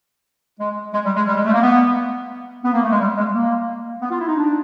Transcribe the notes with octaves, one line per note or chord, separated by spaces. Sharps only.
G#3
G#3
G3
G#3
G3
G#3
A3
A#3
B3
B3
A#3
A3
G#3
G3
G#3
A#3
B3
F4
E4
D#4
D4